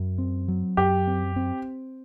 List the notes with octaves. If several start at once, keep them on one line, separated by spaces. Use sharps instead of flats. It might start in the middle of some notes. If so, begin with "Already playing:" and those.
Already playing: F#2
C4
F#3
F#2 G4
C4
C4